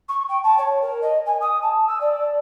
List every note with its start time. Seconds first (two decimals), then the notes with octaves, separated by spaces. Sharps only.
0.08 C#6
0.28 G5
0.43 A5
0.58 C#5
0.81 A#4
1.01 D#5
1.26 G#5
1.40 D#6
1.62 A5
1.87 E6
2.00 D5